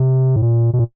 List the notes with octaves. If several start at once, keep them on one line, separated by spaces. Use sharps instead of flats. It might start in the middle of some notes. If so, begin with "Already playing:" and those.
Already playing: C3
A2
A#2
B2
A#2